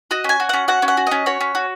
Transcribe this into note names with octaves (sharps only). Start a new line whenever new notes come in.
F#4 D#5
C#4 G#5
F#4
C#4 F#5
F#4 F#5
C#4
F#5
F#4
C#4 D#5
F#4 C#5
C#4
F#4